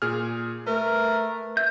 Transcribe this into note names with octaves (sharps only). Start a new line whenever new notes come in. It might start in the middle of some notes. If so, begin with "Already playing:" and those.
A#2 G#4 F6
A3 A#4 B4
E5 G6